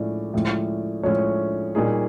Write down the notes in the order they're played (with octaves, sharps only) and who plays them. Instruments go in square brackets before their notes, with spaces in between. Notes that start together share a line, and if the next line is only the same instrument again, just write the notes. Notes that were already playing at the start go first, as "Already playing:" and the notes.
Already playing: [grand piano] A2 F3 G#3 C#4 [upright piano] D5
[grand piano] A2 F3 G#3 C#4
[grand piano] A2 F3 G#3 C#4 [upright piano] C#5
[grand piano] A#2 G3 A#3 D#4 G#4